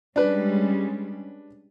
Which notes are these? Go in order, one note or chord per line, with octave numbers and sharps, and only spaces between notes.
G3 G#3 C#4 D4 B4